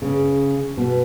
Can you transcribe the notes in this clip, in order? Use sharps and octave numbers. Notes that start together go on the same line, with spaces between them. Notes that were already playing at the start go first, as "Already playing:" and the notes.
C#3
B2